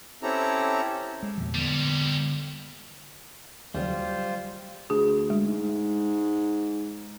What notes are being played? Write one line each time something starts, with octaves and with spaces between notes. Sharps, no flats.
C4 C#4 E4 G4 A4 A#5
G#3
E2 A#2 F3
A#2 D3 G3 B3
D#2 C#3 F#3 G3 F4 C5
D2 G#4
G#3
G#2